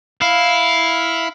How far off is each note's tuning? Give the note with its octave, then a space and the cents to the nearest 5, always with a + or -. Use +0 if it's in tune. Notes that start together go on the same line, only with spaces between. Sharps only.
E4 +0 F5 +5